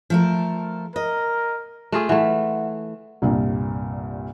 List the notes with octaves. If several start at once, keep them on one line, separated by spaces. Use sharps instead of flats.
F3 A3 A#4
A#4 D#5
A3 F4 G#4
E3 A3 E5 F#5
C2 G2 A#2